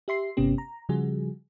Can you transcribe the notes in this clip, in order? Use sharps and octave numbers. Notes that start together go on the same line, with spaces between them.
G4 E5 C6 C7
G1 C3 B3 C#4 G4
A#5
C#3 F3 G3 F#4 G#4